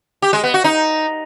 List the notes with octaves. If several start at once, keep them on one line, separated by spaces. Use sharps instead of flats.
G4
G#3
B3
F#4
D#4